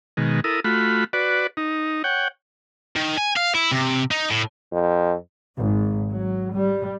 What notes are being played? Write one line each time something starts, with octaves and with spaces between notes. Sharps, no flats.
B2 D#3 G#3
E4 A4 A#4 D#6
A3 F4 F#4 B5
F#4 B4 D5
D#4
C#5 F#5 G5
D#3
G#5
F5
E4
C3
D#4
A2
F2
G#1
F#3
G3